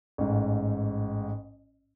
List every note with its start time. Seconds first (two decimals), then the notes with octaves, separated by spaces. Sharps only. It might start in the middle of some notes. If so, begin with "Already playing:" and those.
0.18 A1 G#2